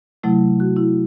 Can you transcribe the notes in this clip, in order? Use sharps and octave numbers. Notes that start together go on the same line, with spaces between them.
C3 F#3 A3 E4
F#4
E4